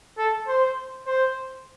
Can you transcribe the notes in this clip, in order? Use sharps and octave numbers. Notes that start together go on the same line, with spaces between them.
A4
C5
C5